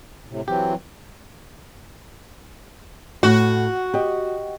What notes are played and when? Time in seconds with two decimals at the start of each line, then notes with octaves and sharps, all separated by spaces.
0.29 A2 C3
0.48 E3 F#3 C4 G4
3.23 A2 F#4 F#5
3.94 G4 D#5